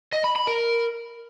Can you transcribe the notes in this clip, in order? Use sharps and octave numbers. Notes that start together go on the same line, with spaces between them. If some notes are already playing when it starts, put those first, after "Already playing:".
D#5
B5
B5
A#4